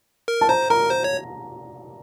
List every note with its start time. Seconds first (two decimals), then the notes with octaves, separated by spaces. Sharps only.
0.28 A#4
0.41 A5
0.49 C5 A#5
0.70 A#4 A#5
0.90 C5
1.04 C#5